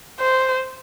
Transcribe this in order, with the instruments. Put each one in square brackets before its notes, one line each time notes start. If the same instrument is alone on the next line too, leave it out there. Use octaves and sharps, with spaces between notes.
[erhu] C5